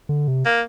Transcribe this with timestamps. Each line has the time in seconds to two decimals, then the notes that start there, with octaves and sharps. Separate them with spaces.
0.09 D3
0.28 C3
0.45 A#3